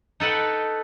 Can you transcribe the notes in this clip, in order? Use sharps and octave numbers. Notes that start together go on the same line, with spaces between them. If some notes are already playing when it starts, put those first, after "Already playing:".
D#4 A4 B4 F#5 G5